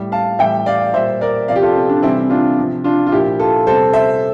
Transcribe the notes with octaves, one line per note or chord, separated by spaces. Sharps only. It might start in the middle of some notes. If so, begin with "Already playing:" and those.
Already playing: A2 G3
F5 A5
A2 E3 G3 E5 G5
D5 F5
A#2 G3 C5 E5
A#4 D5
C3 F3 D5 F5
G4
F4 A4
C4
D4
C3 E3 G3 C4 E4
D4 F4
C3 F3
D4 F4
F4
A#2 F3 E4 G4
F4 A4
C3 G3 A4 C5
C5 E5